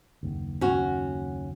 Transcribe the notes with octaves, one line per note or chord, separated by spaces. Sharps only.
F#1 D#2
C#4 F#4